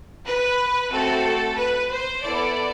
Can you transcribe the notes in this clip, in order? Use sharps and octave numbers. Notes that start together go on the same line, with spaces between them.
B4
A3 C4 F#4 A4
B4
C5
B3 E4 A4 D5